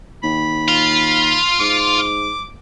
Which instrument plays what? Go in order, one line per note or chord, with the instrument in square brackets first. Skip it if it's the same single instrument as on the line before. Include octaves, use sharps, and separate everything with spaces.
[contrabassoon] D#2 [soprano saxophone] B5
[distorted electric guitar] F4
[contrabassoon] G#2 [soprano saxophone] D6